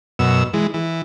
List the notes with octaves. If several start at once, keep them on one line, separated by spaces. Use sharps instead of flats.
F#2 B2 E6
E3 G#3
E3